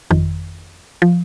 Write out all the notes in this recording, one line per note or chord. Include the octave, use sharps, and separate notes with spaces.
G1 F2 D#3
F3